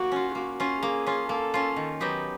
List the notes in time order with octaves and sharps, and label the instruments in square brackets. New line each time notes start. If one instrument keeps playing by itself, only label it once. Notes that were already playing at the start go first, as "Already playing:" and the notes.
Already playing: [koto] A#3 [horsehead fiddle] F#4
[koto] C#4 F4
[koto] A#3 [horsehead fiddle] F#4
[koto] C#4 F4
[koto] A#3 [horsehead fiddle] G#4
[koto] C#4 F4
[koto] A#3 [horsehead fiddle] A4
[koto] C#4 F4
D#3
F#3 B3 D#4 G4